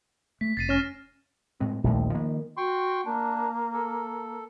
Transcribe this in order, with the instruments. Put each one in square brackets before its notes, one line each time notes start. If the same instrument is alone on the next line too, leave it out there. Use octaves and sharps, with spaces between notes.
[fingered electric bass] A3 [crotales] B6
[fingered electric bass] F1 [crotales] A6 C7 D#7
[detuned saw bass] C#4 [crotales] F6 A#6 E7
[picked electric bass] A2 G#3 C4
[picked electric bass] D1 G3 A3 [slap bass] A#1 D#2
[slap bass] D#3 [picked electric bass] F3 A#3
[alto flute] F#4 [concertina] G5 C6 C#6
[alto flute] A#3 [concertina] D4
[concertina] A4